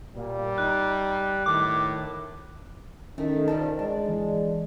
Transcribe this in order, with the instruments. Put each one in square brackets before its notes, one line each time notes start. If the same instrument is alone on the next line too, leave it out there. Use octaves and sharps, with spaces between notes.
[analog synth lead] A#2 [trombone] G3
[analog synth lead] D#4 [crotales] F#6
[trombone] A2 [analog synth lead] D#3 [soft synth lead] D6
[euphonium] D#3 [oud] A3 [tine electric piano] C#4
[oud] E3 F3 G3 [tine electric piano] A5
[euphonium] G#3 [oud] D4 [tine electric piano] A5
[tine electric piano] E3